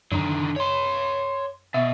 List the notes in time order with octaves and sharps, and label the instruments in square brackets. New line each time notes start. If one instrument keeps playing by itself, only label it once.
[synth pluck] F#2 [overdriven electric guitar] D3 D#3
[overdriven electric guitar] C#5 C6
[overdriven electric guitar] B2 [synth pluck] E5